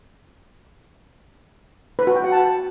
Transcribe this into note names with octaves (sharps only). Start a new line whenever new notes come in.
B4
F#4
G5
F#5
A5